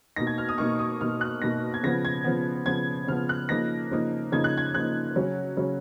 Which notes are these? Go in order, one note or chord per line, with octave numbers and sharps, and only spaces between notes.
B2 A#3 D#4 A#6
G#6
F6
D#6
B2 A#3 D#4 C#6
D#6
B2 A#3 D#4 F6
F#6
B2 A#3 D#4 A#6
G#6
C#3 F3 B3 A#6
G#6
C#3 F3 B3
C#3 F3 B3 G#6
C#3 F3 B3 F6
F#6
C#3 F3 A#3 D#4 A#6
C#3 F3 A#3 D#4
C#3 F3 A#3 D#4 G#6
F#6
G#6
C#3 F3 A#3 D#4 F#6
C#3 F#3 C#4
C#3 F#3 C#4